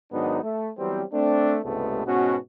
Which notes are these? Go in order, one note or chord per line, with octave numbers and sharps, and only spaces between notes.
G#2 D#3 F#3 B3 D4 D#4
A3
E3 F#3 G3 B3 C4
A3 C4 D4
C#2 G2 C3 G#3 A3 B3
G#2 B2 B3 C#4 F#4